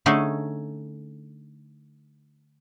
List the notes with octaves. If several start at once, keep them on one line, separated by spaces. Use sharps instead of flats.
D3 A3 C#4 D#4 G#4